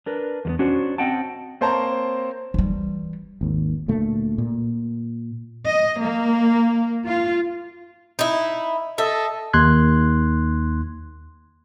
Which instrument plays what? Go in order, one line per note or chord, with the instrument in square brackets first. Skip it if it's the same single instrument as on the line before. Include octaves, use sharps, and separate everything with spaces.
[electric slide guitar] D4 A#4 B4
E2 G3 B3
C#4 D4 F#4 C5
C4 D#5 F#5 G5 A5
[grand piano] A#3 C4 C5 C#5 A5 A#5
[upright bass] E3 G3
[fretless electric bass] G#1 D#2
D2 A#2 A3
A#2
[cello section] D#5
A#3
F4
[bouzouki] D#4 E4
[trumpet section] A4 D#5 [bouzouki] E5
[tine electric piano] D#2 C6 F#6 G#6